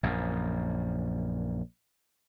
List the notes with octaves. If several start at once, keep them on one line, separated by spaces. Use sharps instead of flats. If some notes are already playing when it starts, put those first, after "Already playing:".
A#1 F#2